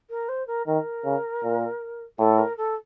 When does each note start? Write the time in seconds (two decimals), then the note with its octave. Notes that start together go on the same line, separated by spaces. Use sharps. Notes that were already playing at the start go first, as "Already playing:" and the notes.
0.10 A#4
0.29 C5
0.47 A#4
0.67 D#3 A#4
1.05 C#3
1.44 A#2
2.18 A2 A4
2.38 A#4
2.57 A4